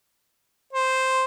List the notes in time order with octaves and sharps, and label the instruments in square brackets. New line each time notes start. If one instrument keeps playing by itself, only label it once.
[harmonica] C5